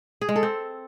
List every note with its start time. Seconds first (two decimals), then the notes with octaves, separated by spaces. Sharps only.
0.21 G#4
0.29 G#3
0.36 A4
0.43 C4